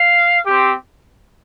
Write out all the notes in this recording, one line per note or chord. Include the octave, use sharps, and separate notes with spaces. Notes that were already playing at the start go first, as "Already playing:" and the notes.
Already playing: F5
C4 G4